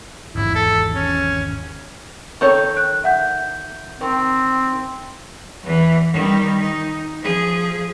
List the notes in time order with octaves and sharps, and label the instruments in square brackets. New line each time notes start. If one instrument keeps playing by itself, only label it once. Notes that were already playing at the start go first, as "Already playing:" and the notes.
[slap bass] G#1 E2 G#2 [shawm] E4
[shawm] A4
C#4
[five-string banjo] D#3 A4 C#5 [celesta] C#6 G6
[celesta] F#6
E5 F#5 G6
[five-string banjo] D#3 [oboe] C4
[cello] E2 E3
D#3 G3
D#4
F3 G#4